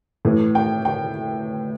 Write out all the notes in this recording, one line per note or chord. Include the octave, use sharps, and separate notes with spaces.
A2 E3
G5
G5